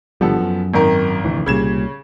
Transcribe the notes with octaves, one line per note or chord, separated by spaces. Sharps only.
G#1 D3 F3 G3 B3 A4
F#2
G#1 D#3 A#4
F1 D2 E3
C2 A#2 C#3 G3 G#6 E7